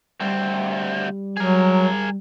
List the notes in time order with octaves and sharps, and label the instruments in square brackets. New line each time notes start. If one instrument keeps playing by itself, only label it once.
[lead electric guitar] D2 C4 [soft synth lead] G3
[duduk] F#3 [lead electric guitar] G#4 A#4